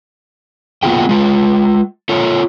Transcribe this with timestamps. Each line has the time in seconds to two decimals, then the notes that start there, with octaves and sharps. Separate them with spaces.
0.83 A#3 B3 F4 F#4 G#4 G5
1.09 G#3 F4
2.09 F4 A4 C#5